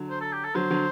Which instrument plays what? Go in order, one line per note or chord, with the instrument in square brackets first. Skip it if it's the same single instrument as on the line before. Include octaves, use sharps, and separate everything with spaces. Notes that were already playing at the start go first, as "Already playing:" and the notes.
Already playing: [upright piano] D3 F#3
[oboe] C5
A4
G4
A4
[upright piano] D3 F#3 [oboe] C5
[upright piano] D3 F#3